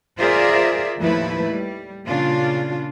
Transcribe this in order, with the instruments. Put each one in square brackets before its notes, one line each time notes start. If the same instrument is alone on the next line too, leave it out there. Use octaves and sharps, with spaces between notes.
[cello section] F4 G#4 A#4 C5 D5 E5
D#2 A2 F3 A3 E4 B4
G3
A#2 C#3 D4 F4